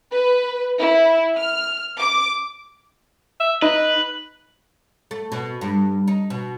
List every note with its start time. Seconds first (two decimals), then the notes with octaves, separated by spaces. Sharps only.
0.12 B4
0.80 E4
1.38 F6
1.97 D6
3.40 E5
3.62 D#4 B4 D#5
5.11 A3
5.32 B2
5.61 G2
6.08 D#4
6.30 B2